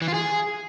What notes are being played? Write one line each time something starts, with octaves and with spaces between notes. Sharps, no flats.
E3
F4
G#4